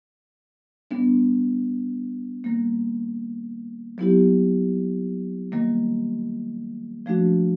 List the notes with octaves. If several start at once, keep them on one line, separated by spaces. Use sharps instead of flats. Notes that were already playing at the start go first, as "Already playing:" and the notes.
G3 B3 D4
D#3 G3 A#3
F#3 B3 E4 G4
D#3 G3 A#3
F3 A3 D4 F#4